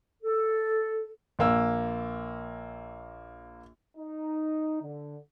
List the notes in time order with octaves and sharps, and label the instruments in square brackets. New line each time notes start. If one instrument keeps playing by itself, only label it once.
[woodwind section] A4
[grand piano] A#1 A#3 E6
[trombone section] D#4
D3